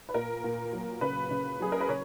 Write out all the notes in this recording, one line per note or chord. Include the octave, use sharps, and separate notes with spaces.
B4
A#2 A#4
A#2
F#3
C#3 B4
C#3
F#3 G#4
A#4
B4
C#3 C#5